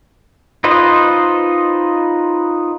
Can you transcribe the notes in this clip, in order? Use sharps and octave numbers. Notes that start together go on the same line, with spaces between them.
D#4 F4 B4 C5 D#5